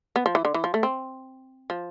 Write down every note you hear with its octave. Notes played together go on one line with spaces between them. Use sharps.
B3
F3
E3
D3
E3
F3
A3
C4
F3